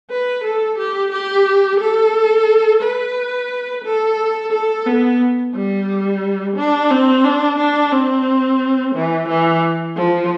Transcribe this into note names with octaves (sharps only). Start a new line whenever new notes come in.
B4
A4
G4
G4
A4
B4
A4
A4
B3
G3
D4
C4
D4
D4
C4
E3
E3
F3